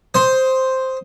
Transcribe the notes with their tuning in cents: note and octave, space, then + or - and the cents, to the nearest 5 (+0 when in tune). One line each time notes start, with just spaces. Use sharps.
C5 +0 D#6 +20